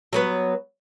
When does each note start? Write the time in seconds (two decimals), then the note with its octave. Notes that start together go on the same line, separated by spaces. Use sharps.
0.13 F#3 B3 B4